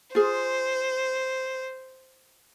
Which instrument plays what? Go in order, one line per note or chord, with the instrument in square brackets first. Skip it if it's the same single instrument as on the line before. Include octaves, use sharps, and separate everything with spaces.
[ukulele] F4 G#4 [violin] C5